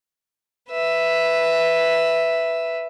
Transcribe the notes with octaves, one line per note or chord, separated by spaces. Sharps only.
B4 E5